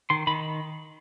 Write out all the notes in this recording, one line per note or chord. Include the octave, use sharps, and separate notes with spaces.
D#3 C6
D#3 B5